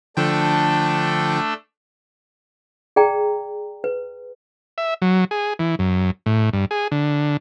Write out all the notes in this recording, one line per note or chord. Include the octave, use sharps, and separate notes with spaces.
D3 F3 A3 D4 A4 G5
G#4 D5 G5 A#5
B4
E5
F#3
G#4
E3
F#2
A2
G2
G#4
D3